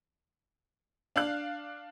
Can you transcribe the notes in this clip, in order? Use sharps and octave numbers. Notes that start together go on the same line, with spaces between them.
D4 F5 F#6